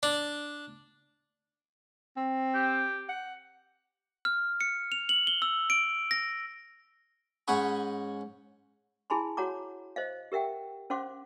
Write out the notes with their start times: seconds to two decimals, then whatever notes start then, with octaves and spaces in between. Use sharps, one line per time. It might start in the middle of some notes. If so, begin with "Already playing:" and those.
0.03 D4
2.17 C4
2.54 G4
3.09 F#5
4.25 F6
4.61 C#7
4.92 F7
5.09 F#7
5.27 G7
5.42 E6
5.70 D7
6.11 A#6
7.48 G#2 C#4 F#5 B5 C#6 D#6
9.10 E4 G#4 G#5 A5 B5 C6
9.37 F#4 C#5 F#5 A#5 D6
9.96 C5 D#5 F5
10.32 G4 A#4 E5 F#5 G5
10.90 C#4 C5 F5 F#5 C6 D6